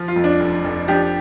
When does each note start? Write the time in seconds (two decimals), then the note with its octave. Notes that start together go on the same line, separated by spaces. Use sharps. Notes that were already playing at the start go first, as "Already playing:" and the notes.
Already playing: F3
0.08 F4
0.16 F2
0.24 D4
0.40 F1
0.64 F1
0.88 F3 D4 G4